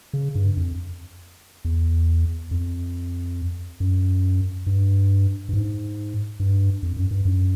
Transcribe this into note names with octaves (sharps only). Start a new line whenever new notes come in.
C#3
G2
F2
E2
F2
F#2
G2
G2
G#2
G2
F2
F#2
G2
F#2